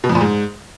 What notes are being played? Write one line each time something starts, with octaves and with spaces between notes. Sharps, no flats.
B2
F2
A#2
G#2